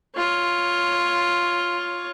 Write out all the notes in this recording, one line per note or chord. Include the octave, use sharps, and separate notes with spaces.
F4 C#5